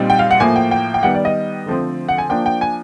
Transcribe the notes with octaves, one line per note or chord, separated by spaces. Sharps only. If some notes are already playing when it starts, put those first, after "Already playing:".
Already playing: A#2 G3 C4 D#4
G5
F5
F#5
A2 F3 A#3 G#5
G5
G5
G5
D#3 G3 B3 F#5
D5
D#5
D3 F3 A3 C4
F#5
G#5
F3 A#3 D4 G5
G5
G#5